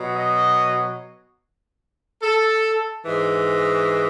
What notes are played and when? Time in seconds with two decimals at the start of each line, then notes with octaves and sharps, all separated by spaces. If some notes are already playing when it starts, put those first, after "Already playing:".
Already playing: B2 F#3
0.15 D#5
2.23 A4
3.05 G#2 E3